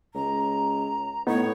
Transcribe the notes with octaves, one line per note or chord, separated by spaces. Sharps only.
C#2 A#5
A2 B3 D#4 C#5